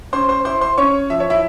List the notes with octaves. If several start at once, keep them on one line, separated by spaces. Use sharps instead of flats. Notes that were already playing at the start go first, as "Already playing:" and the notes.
C#4 C5 C6
C5 C6
E4 C5 C6
C5 C6
C#4 C#5 C#6
F3 E5
C#5
E4 E5